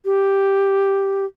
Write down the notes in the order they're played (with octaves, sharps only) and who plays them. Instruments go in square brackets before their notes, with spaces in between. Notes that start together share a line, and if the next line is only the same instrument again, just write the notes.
[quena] G4